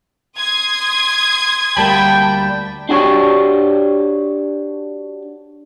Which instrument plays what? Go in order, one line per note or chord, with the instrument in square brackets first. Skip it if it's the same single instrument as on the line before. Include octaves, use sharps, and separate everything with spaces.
[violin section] C6 D#6 G#6
[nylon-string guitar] D2 G3 A#3 [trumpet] G5 [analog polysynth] A5 B5
[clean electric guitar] D4 F#4 G4 C#5